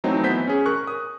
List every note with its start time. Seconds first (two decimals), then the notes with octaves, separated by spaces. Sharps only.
0.04 E3 F#3 A3 C4 D#4
0.23 E3 B3 E4 C5 G6 B6
0.47 C#4 G#4
0.66 A#4 C#6 F#6
0.87 D#6